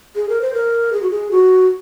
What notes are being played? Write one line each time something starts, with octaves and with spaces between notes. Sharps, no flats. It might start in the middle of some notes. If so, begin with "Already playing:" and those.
G#4
A#4
C5
A#4
G#4
F#4
G#4
F#4